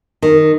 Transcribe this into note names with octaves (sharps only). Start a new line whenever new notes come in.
D#3